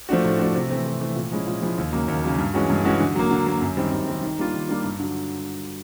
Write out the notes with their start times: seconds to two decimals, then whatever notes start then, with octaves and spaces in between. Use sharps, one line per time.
0.09 F3 A3 D4 F#4
0.24 A2
0.39 F3 A3 D4 F#4
0.55 C3
0.70 E3 A3 C4
0.85 C3
1.00 E3 A3 C4
1.16 A#2
1.31 F3 G#3 C#4 E4
1.47 A#2
1.62 F3 G#3 C#4 E4
1.78 D#2
1.93 C#3 F#3 A#3
2.08 D#2
2.23 C#3 F#3 A#3
2.38 G2
2.54 E3 G#3 C#4 F#4
2.70 G2
2.85 E3 G#3 C#4 F#4
3.00 D3
3.15 F#3 A#3
3.31 D3
3.46 F#3 A#3
3.61 F#2
3.77 D#3 G3 C4
3.92 F#2
4.07 D#3 G3 C4
4.23 D#3
4.39 G3 A#3 D4 F4
4.54 D#3
4.69 G3 A#3 D4 F4
4.84 G2
5.00 D3 F#3